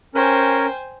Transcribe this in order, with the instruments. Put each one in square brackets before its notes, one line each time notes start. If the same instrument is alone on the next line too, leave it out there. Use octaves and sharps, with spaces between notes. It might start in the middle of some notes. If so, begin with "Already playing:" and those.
[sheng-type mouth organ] C#4 A#4 [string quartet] C5 G5 G#5